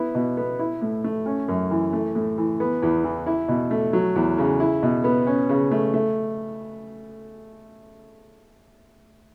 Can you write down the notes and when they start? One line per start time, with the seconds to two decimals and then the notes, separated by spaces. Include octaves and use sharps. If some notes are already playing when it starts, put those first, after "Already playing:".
Already playing: B3 E4
0.15 B2
0.37 B3
0.59 E4
0.81 A2
1.04 A3
1.26 C#4
1.48 F#2
1.71 E3
1.93 A3
2.15 A2
2.38 E3
2.60 B3
2.82 E2
3.04 E3
3.26 E4
3.48 B2
3.71 A3
3.93 F#3
4.15 E2
4.38 C#3
4.60 E4
4.83 B2
5.04 B3
5.27 C#4
5.49 C#3
5.71 A3
5.94 A3